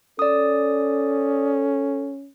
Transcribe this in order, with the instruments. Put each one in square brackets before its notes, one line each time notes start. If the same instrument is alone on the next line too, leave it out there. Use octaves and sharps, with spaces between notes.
[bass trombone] C#4 [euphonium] A4 [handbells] D5 D#6